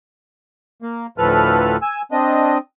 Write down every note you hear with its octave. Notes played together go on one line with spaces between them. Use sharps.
A#3
D2 A2 F3 A4 B4 F6
G#5 E6
C4 D4 D#5